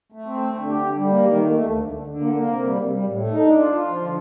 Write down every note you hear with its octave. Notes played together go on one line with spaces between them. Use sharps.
A3
C4
A3
D3
G4
D3
G3
A#3
D#3
A3
A3
D2
D3
D3
D3
A#3
A#3
C3
G3
C3
G3
A2
A3
D#4
D4
F4
F4
F3
D3